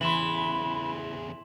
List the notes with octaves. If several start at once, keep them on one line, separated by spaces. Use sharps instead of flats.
E2 C#3 E3 B5 C6 E7 F#7